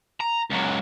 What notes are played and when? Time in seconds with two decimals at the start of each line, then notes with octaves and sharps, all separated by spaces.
0.21 A#5
0.51 C#2 F#3